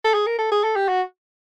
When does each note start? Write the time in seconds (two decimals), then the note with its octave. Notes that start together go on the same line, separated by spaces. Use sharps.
0.05 A4
0.14 G#4
0.26 A#4
0.39 A4
0.52 G#4
0.64 A4
0.76 G4
0.88 F#4